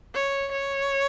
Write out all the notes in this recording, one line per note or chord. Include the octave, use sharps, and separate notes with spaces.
C#5
C#5